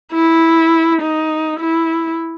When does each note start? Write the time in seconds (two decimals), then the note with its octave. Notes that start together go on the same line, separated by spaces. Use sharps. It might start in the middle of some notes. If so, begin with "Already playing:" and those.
0.13 E4
1.02 D#4
1.60 E4